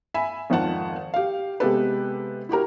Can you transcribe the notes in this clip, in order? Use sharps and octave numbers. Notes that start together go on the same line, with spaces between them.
E5 G#5 B5
G#1 F2 D#3 F#5 A5
G4 F5
C3 G#3 B3 G4 A4 B4
E4 F#4 G4 A#4